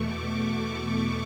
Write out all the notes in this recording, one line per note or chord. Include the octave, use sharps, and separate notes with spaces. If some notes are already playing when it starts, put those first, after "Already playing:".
Already playing: E2 B2 A3 C#6 D6
C#6